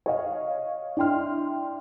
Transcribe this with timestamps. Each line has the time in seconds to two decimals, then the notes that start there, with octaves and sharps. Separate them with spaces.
0.06 C#5 D#5 F5
0.97 D4 E4 G5 C6 F6